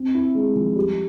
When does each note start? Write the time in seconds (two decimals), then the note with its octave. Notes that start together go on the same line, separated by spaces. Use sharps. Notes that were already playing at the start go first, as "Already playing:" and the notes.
Already playing: C4
0.14 E4
0.35 G#3
0.56 F3
0.76 G3